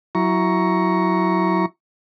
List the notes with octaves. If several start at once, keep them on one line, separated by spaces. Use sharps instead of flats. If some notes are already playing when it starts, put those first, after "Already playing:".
F#3 E4 A#5 C#6